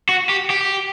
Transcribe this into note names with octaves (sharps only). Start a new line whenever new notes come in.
F#4
G4
G4